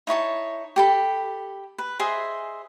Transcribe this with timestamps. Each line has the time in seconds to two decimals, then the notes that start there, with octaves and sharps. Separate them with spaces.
0.07 D#4 E4 C#5 A5
0.76 G4 A4 B5
1.78 B4
2.00 G#4 C5 D#5 E5